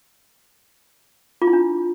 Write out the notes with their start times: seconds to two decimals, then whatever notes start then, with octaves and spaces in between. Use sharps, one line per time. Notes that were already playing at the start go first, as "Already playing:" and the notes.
1.42 F4
1.47 E4
1.53 D4